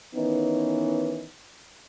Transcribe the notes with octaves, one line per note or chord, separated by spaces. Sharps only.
D#3 E3 B3 C#4 D#4